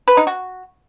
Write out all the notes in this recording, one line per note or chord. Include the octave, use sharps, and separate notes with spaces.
B4
D#4
F#4